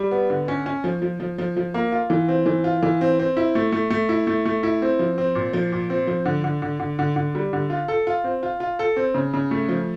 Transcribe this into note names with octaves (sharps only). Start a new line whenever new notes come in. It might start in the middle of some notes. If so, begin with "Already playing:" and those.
Already playing: G3
B3
D3
C#4
C#4
F3
F3
F3
F3
F3
A#3
F4
E3
C4
E3
F4
E3
C4
C4
E4
A3
A3
A3
E4
A3
A3
E4
C4
F3
C4
A#2
F3
A#2
C4
F3
D3
D3
D3
D3
D3
D3
G3
D3
F4
A4
F4
C4
F4
F4
A4
C4
C#3
C#3
A3
F3